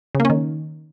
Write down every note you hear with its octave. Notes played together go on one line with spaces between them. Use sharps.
C#3
A#3
C#4
D#3